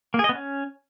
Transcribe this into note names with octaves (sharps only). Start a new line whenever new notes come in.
A#3
G#4
D#5
B3
C#4